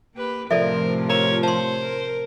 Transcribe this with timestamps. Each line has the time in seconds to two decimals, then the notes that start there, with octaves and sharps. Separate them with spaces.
0.15 A#3 G4 B4
0.51 A2 C3 F3 A3 A4 A#4 D5 E5
1.10 G4 A#4 C#5 A#5
1.43 C5 A5 C6
1.83 A#4